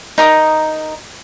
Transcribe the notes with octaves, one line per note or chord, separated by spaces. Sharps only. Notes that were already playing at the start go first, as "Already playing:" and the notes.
D#4 A#4 D#6